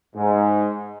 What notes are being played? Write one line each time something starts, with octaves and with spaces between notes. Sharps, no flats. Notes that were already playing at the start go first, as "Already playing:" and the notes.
G#2